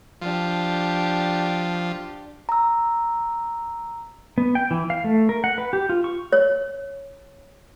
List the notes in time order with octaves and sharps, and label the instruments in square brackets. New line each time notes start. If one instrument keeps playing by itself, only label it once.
[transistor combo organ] F3 [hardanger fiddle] D4 G4
[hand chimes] A#5 E6
[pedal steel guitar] B3
G5
E3
F5
A3
A#4
F#5
B4
G4
F4
C#6
[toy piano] C#5